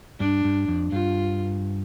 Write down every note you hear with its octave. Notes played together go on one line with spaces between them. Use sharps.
G2 D4
G2
F2
G2 F4